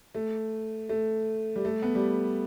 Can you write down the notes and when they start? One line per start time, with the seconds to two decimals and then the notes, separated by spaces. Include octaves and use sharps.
0.15 A3
0.89 A3
1.56 G3
1.65 A3
1.82 B3
1.95 G3